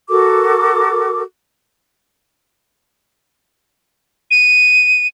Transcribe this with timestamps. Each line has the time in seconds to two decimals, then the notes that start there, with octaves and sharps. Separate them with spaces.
0.09 F#4 A4 A#4 D6
4.31 D#7